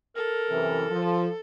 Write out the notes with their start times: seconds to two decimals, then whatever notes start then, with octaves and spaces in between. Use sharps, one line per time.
0.16 A4 A#4
0.51 F#2 C3 E3
0.91 F3